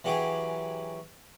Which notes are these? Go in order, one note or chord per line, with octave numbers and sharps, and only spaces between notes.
E3 F#3 G4 G#4